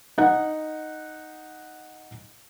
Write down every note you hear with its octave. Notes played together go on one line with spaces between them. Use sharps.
D#4 F#5